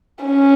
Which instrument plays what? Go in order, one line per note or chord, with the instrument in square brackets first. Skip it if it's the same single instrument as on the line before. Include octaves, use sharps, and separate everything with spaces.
[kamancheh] C#4